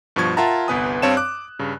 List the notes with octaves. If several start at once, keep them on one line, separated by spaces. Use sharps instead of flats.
G2 B2 F3 C#6 G#6
F4 A#4 E5 F#5 A5 A#5
G1 C2 B3 B4 G#5 D#6
G2 C4 C#5 F5 A5 E7
D6 F#6
G2 C#3